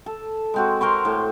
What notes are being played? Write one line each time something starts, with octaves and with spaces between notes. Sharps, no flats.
A4
G#3 C4 F#4
C4 A#4 C6 C#6
A2